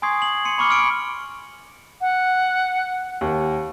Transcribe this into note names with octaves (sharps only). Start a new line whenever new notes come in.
G#5 C6 C#6 D#6 G#6 C7
F#7
C6 C#7 D#7
B5 C#6 D6 F6 C#7 G7
F6 D7
F#5
D#2